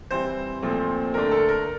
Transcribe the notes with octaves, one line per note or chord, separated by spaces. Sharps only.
E3 G3 C4 C5
A#2 F3 A3 C4
D3 A3 D4 A#4
A4
A#4